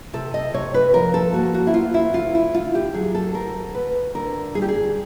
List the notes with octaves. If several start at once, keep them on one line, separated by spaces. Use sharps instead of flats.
C3 A4
D#5
C3 C#5
B4
F3 A#4
A4
A#3 F#4
F#4
E4
D2 F4
E4
D2 F4
E4
D3 F4
G4
F#3 G#4
A4
D2 A#4
D2 B4
D3 A#4
G3 G#4
G4
G#4